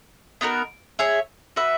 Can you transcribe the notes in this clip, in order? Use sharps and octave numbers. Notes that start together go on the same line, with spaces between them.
B3 D#4 F#4 A#4
G#4 C#5 E5
F#4 B4 E5